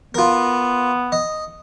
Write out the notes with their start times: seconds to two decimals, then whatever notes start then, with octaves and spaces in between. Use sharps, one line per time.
0.14 B3 F4 A#4
1.12 D#5